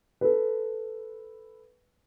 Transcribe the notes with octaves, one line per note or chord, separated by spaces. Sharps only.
A4 B4